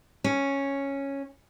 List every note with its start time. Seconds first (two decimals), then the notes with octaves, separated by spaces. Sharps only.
0.24 C#4